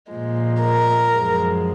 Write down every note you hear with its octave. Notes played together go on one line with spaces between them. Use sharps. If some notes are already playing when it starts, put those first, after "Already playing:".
A#2 F3 G#3
A#4
F#2 F3 G#3